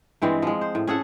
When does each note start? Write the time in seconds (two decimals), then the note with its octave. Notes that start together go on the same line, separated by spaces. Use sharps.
0.22 G2 E3 G#3 C4
0.42 F3 G#3
0.61 C5
0.75 A2
0.87 C#4 G#4 A4 F#5